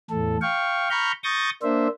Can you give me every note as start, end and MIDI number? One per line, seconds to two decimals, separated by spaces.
0.10 0.37 40
0.10 0.37 45
0.10 0.37 69
0.41 0.89 77
0.41 0.89 79
0.41 0.89 85
0.90 1.12 82
0.90 1.12 83
0.90 1.12 85
0.90 1.12 89
0.90 1.12 91
1.24 1.50 85
1.24 1.50 87
1.24 1.50 91
1.24 1.50 93
1.24 1.50 94
1.63 1.88 58
1.63 1.88 62
1.63 1.88 72
1.63 1.88 76